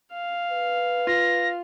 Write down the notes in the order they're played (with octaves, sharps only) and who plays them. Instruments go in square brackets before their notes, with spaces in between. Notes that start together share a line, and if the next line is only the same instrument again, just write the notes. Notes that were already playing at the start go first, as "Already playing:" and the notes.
[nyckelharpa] F5
[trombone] B4
[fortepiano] F4 [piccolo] A#6